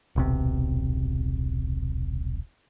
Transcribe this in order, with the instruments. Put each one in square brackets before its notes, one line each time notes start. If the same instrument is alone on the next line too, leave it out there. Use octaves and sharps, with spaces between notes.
[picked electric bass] D#1 B1 C3